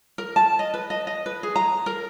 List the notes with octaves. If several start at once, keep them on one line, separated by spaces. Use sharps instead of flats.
A#4
A5
D#5
B4
D#5
D#5
B4
G#4
A#5
A#4